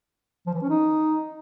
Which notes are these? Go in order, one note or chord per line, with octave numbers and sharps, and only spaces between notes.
F3
E3
C#4
D#4